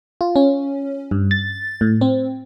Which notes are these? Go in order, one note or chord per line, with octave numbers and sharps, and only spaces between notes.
F4
C#4
G2
A6
A2
C4